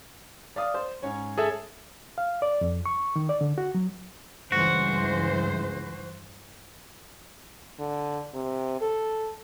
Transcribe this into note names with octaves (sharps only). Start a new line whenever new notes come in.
D5 F5 D#6
C5
G#2 C#4 C#5
G#4 A4 E5
F5
D5
F2
C#6
D#3
D5
D3
F#4
F#3
C#2 G2 E3 F#4 C5
D3
C3
A4